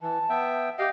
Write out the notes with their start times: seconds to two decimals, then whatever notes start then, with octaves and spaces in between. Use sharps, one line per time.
0.01 E3 A5
0.30 B3 E5 G5
0.78 G4 D#5 F5 G5